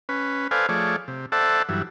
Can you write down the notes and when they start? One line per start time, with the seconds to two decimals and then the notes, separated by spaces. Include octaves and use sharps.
0.09 C#4 B4
0.51 A4 B4 C5 D5 F5 G#5
0.69 F3 A3 G#4 C#5 D5
1.08 C3
1.32 A4 C5 D5 E5 F#5 A5
1.69 G2 E3 F#3